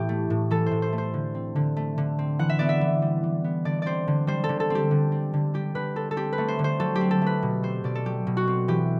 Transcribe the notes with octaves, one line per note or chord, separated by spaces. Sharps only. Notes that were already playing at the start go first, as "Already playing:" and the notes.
Already playing: A2 E3 B3 G4 A4
A3
A2
E3 A4
C5
A2
C5
A3
C5
D3
C4
D3
A3
D3
C4
E3 F#5
E5
B3 D5
E5
E3
G3
E3
B3
D3 D5
C4 C5 D5
D3
G3 C5
A4
D3
A4
C4 G4
D3
C4
D3
G3 G4
D3 B4
C4 A4
A4
C4 G4
B4
A3
C5
D3
C5
F#3 A4
G4
C4
A4
A3 B4
B2
C4 C5
B2 D5
A4
F#3 G4
B2
F#4
C4
E3 G4